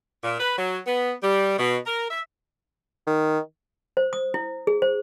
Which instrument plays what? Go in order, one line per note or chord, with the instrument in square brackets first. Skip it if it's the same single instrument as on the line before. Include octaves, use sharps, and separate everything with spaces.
[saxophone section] A#2
B4
F#3
B3
G3
B2
A#4
E5
[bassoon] D#3
[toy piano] C5
D#6
E4
G#4
C5